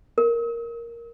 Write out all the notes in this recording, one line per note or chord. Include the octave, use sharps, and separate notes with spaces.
A#4